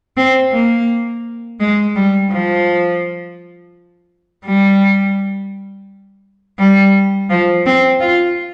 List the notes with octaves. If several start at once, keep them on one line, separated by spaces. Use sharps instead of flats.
C4
A#3
G#3
G3
F3
G3
G3
F3
C4
F4